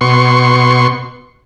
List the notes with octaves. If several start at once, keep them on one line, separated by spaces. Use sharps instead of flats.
B2 C6 C#6